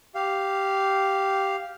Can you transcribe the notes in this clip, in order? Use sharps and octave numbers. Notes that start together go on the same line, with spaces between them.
G4 F5